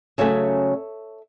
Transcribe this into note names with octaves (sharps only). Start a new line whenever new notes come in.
C#3 F#3 A3 C#4 C#5 E5